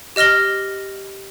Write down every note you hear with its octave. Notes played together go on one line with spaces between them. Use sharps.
G4 D#5 F6 A#6 G7